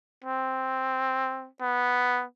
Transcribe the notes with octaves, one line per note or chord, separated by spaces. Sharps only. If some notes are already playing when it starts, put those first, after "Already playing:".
C4
B3